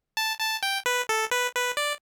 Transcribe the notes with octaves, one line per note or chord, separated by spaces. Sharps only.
A5
A5
G5
B4
A4
B4
B4
D5